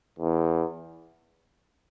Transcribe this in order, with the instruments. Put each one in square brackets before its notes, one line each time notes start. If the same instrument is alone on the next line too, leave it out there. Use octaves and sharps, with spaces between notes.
[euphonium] E2